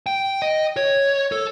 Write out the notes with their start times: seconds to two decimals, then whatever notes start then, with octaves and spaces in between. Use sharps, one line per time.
0.06 G5
0.42 D#5
0.77 C#5
1.32 A4